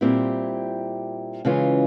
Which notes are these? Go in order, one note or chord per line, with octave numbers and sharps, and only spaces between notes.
A#2 G3 C4 E4 G4
C#3 E3 G#3 C#4 F4